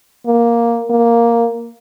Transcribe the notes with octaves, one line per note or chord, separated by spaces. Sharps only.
A#3
A#3